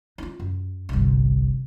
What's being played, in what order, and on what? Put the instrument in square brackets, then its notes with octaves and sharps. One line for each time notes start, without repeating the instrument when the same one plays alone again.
[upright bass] D#4 F4
F#2
G1 C2